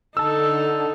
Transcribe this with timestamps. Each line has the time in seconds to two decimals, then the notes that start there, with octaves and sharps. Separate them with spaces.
0.17 D3 D#4 A4 A5 E6